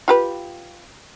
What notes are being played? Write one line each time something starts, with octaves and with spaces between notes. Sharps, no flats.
F4 G4 B4